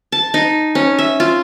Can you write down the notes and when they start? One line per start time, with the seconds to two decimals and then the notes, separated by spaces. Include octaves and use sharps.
0.12 A5
0.34 D#4
0.75 C#4
0.99 E5
1.20 F4